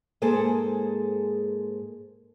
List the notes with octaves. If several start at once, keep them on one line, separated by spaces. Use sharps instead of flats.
G#2 G#3 A#3 G#4 A4 C5